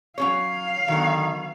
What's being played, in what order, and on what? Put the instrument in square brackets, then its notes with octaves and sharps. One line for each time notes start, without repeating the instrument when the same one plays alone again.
[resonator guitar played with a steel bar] F#3 C#4 C#5 [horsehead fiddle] F5
[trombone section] D3 D#3 [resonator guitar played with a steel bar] F#3 B3